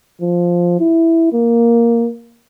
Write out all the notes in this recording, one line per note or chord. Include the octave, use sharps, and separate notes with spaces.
F3
E4
A#3